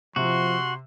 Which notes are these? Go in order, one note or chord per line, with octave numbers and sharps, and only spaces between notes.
C3 F3 F#4 C6